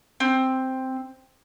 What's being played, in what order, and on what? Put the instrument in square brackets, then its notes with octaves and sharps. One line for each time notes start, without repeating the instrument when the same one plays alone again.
[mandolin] C4